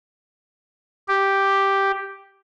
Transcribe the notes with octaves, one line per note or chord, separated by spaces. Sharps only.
G4